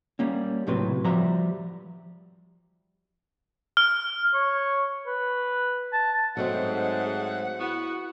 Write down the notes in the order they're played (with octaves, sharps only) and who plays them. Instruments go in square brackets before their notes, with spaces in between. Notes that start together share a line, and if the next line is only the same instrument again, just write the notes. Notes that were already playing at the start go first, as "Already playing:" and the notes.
[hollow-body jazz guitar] G3 A#3 C#4
C#2 A2 C3 F#3 C4 B4
F3 G3 F#4 G4 E5 A#5
[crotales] F6
[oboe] C#5
B4
A5
[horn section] G#2 [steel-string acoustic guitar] F#3 A3 C4 [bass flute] D#5 [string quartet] F#5
[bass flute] G#4
[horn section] B3 F#4 [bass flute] E4